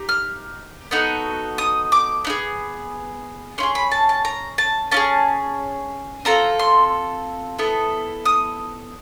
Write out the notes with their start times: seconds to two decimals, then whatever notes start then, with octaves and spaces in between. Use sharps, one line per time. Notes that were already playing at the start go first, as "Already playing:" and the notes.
Already playing: D#4 G4
0.09 F6
0.91 B3 D#4 F#4 A4
1.58 D#6
1.92 D6
2.25 B3 D#4
2.30 G#4
3.58 C#4 E4 C6
3.63 G#4
3.75 B5
3.91 A5
4.09 A5
4.25 A#5
4.58 A5
4.91 C#4 F4 A5
4.97 G#4
6.25 C4 F4 A4 A#5
6.59 C6
7.58 B3 E4 A4
8.25 D#6